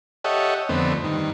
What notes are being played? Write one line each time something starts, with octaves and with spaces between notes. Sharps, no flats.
G4 A4 C#5 D#5 E5 F#5
F2 D3 A3 B3 C4
G2 D#3